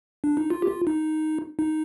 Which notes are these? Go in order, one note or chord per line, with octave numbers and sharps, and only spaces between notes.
D4
D#4
F4
G4
F4
D#4
D#4